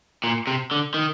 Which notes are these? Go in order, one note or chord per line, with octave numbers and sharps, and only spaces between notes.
A#2
C3
D3
D#3